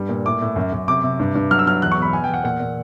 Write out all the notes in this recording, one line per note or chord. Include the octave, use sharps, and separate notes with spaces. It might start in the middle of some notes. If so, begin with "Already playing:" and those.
Already playing: G2 G3
A#2
A2 D6
A2
F#2
F#2
C3 D6
C3
G2
G2
F#3 F6
E6
F#3 F6
E2 F#6
C#6
B2 B5
B2 G#5
E2 G5
F#5
A#2 F#5
A#2